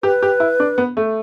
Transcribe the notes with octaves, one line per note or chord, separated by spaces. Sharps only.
G4 B4
G4
E4
D4
B3
A3